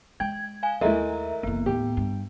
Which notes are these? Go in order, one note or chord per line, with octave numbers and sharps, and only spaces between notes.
G#3 G5 G#6
F5 G#5
D#2 G#3 A3 E4 A#4 E5 A#5
F#1 E3 B3
D#2 A2 G4
G2